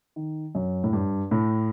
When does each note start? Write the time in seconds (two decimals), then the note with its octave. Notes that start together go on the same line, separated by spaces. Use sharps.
0.16 D#3
0.55 F#2
0.84 A2
0.93 G2
1.31 A2